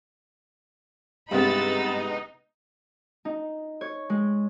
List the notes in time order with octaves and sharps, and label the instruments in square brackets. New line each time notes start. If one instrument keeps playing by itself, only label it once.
[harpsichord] G2 [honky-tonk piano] C3 G#3 B3 [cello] D#4 [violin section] B5 E6 A6
[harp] D#4
C#5
G#3